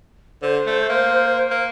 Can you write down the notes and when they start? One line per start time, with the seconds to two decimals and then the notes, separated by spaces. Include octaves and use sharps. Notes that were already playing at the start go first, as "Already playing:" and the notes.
0.42 D3 C5
0.67 A3
0.89 A#3
1.51 A#3